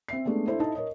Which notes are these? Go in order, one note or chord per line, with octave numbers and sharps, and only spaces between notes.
C4 E5 C7
G#3 A3 B3 D4
D4 E4 A4 C5
D#4 E4 A4 D#5 A5
A#4 C#5 D#5